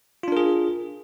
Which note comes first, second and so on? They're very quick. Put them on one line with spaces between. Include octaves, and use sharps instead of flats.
F4 D4 A#4 G#4